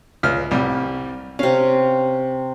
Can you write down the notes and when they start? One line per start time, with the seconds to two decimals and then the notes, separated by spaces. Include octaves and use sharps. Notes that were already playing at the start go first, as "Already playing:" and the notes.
0.23 C#2 F6
0.51 C2 G3
1.39 C3 C#4 F5